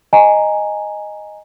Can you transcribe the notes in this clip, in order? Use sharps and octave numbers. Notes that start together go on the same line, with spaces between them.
D#5 G#5 A#5